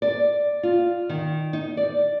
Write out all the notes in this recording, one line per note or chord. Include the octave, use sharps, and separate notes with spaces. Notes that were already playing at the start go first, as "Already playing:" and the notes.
D5
F4
D#3
D#4
D5